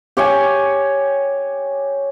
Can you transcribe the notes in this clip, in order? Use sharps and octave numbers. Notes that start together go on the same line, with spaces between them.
G4 C#5 G5 G#5